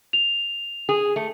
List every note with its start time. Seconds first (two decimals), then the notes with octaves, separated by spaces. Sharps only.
0.13 F7
0.89 G#4
1.16 A3